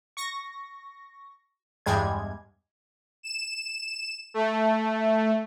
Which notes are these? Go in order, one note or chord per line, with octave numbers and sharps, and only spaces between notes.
C#6 A#6
E2 G2 G3 G#3 G#6
E7
A3